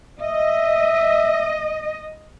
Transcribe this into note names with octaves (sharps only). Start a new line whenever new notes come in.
D#5 E5